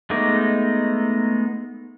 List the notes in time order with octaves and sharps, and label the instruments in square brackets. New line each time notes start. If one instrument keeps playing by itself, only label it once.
[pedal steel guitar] G#3 A3 B3 D#4 D6